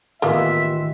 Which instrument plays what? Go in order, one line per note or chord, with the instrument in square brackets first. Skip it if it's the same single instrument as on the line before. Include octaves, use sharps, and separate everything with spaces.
[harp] A1 D#3 F#5 [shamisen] A#3 B3 [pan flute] F4 [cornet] E5